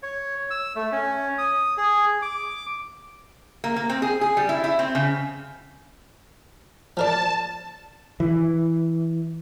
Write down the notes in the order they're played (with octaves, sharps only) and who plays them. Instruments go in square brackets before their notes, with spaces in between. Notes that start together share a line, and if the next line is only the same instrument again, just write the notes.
[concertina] C#5
E6
A3
C#4
D#6
G#4
D6
[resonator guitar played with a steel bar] A#3
A#3
C4
G#4
G#4
G3
E4
E4
C4
C#3
[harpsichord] F3 A#4 D5 [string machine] A5
[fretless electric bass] E3